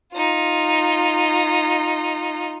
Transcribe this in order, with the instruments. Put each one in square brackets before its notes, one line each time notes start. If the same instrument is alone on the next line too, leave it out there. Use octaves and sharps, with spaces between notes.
[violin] D#4 F4